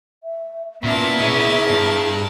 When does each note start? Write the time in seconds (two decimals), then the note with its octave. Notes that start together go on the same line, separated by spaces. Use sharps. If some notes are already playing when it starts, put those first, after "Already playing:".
0.23 E5
0.84 A#2 B3 C#4 E4 A#4 E5 A5
1.20 G#4 C#5 D#5
1.69 G2